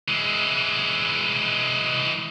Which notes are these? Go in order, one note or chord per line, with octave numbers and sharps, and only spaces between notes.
E3 G#3